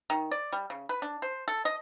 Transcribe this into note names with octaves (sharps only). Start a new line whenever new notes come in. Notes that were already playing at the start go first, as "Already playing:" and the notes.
D#3
D5
G3
C#3
B4
D4
C5
A4
D#5